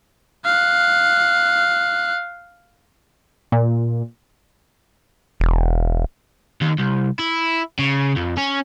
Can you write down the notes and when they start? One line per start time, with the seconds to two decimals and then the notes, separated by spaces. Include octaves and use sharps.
0.45 F5 F#6
3.52 A#2
5.40 E1
6.62 D#2
6.79 C2
7.19 E4
7.79 C#3
8.16 F2
8.38 C#4